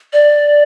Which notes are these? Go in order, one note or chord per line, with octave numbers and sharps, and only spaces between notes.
D5